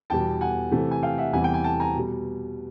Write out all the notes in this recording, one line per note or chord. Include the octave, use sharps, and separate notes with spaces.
E2 B2 G3 G5 A5
F#5 G#5
C3 E3 A3
G#5
F5 G5
E5 F#5
E2 C3 E3 G3 F#5 G#5
G5
G#5
G5 A5
G#5 A#5
B2
G3